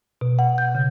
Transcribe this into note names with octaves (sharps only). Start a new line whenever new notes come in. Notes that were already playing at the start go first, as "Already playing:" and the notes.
B2
F#5
G6
C#3